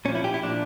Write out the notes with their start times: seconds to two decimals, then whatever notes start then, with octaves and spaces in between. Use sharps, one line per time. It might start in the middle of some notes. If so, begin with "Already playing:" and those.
0.05 A#2 C#4
0.09 F3
0.15 E4
0.24 G4
0.34 E4
0.43 A#2 F3 D4